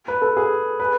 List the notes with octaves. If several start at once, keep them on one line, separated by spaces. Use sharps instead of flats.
B4
A4
G#4
B4